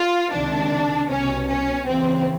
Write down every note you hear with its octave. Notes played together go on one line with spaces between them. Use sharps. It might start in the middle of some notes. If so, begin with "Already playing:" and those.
Already playing: F4
C#2 C3 D#3 D4
C2 B2 C#4
C#4
D#2 C#3 E3 C4